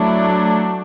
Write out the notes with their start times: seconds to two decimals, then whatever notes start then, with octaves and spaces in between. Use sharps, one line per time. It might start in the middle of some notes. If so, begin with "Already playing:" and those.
Already playing: F#3 A3 D4 E4